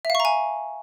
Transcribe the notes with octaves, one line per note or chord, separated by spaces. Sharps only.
E5
F5
C#6
A#5
G#5